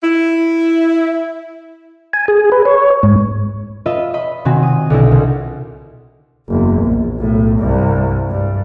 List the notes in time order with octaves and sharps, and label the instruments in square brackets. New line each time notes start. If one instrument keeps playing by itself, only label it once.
[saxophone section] E4
[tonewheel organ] G#5
G#4
B4
C#5
G#2
[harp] F4 B4 D#5 E5
D#5 B5
C3 D#3 C4 F#4 G#5
D#6
B1 D3 E4
C2
[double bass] F#1 E2
A#1
B1 A2
C2 G2
G2